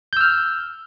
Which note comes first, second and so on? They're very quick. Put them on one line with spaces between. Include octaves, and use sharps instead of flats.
G6 E6 F6